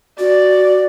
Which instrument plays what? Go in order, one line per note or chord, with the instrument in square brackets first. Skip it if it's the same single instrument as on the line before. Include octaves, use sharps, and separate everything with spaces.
[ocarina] F#4 [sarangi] D5